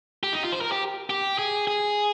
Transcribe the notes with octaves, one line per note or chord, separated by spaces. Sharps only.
G4
D#4
F4
C5
A#4
G4
G4
G#4
G#4